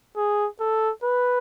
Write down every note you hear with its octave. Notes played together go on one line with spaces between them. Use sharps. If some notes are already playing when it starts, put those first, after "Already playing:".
G#4
A4
B4